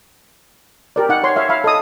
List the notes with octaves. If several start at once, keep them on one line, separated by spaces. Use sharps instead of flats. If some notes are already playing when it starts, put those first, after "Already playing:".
G4 A#4 D5
D#4 F#5
C#5 C6
C#5 E5 F5
E5 F5 B5
A4 D#5 D#6